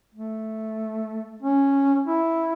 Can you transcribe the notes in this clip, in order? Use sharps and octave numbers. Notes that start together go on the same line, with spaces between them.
A3
C#4
E4